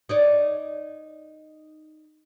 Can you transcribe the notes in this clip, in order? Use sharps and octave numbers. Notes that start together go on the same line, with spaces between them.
D#4 C#5 D5